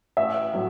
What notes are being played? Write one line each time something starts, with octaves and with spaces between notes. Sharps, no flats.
A1 E5
A2 F#3